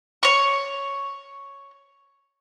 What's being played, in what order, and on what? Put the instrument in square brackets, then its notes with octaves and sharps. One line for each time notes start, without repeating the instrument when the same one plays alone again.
[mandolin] C#5 C#6